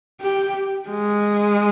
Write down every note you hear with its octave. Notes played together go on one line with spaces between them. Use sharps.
G4
G#3